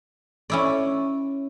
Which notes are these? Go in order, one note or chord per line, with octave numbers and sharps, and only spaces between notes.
C#4 E4 D5